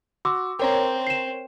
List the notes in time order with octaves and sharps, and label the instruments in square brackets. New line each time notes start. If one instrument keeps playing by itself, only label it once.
[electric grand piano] F#4 [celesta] C6 D6 E6
[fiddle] C4 [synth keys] A#4 C#5 [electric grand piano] G5 A#5
[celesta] C7 E7